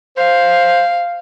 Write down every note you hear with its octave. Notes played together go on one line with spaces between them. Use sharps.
C5 F5